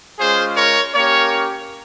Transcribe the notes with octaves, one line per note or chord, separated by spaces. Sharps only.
G#3 C#4 F4 G#4 C5
A#4 C#5
A#3 C#4 G4 A#4 C#5